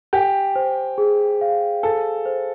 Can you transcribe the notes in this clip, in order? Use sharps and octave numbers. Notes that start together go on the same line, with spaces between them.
G4 G#5
C5
G#4
F5
A4 G#5
C5